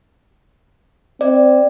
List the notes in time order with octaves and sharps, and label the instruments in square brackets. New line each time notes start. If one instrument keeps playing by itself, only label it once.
[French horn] C4 [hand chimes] D5